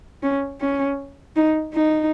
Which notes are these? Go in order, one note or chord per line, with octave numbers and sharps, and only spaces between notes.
C#4
C#4
D#4
D#4